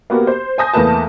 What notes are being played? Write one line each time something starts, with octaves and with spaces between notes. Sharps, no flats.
A#3 B3 F#4 G4 A#4
C5
C5 G#5 A5 D#6 G6 A#6
E2 A3 A#3 B4 A5